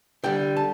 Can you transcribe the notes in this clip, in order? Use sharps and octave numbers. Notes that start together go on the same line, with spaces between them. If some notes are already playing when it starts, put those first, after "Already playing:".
D3 G3 G5
A5